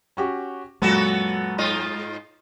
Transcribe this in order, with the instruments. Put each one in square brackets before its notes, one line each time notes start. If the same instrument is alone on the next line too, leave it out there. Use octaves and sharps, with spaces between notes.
[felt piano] C#4 F#4 G4
[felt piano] F#2 A#2 F#3 [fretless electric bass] G#3 [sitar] B3 F#4 A4
[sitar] G#2 F4 D#5